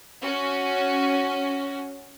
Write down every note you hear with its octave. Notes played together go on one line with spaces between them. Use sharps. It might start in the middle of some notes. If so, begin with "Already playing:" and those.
C#4 F#4